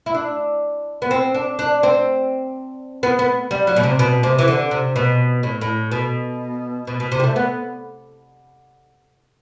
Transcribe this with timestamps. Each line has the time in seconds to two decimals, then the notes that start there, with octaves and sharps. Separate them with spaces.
0.06 E4
0.15 D4
1.02 B3
1.11 C4
1.35 D4
1.59 D4
1.83 C4
3.03 B3
3.19 B3
3.51 G3
3.67 F#3
3.76 B2
3.83 C3
3.99 B2
4.23 C3
4.39 E3
4.48 D3
4.71 C3
4.96 B2
5.43 A2
5.62 A2
5.92 B2
6.87 B2
7.00 B2
7.12 C3
7.20 G3
7.24 A3
7.36 B3